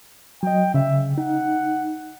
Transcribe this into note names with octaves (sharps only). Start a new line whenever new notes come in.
F#3 D#5 G5
C#3 E5
D#4 F#5